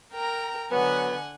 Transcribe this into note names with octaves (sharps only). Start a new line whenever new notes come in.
A#4 G5 A#5
D3 F#3 B3 F#5 G#5